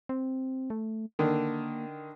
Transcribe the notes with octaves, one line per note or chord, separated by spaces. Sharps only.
C4
A3
D3 D#3 A#3